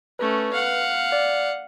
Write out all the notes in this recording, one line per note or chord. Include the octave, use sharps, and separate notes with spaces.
A3 C#4 B4
F5 F#5
D5